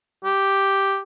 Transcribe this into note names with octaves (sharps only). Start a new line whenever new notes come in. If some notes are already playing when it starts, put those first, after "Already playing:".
G4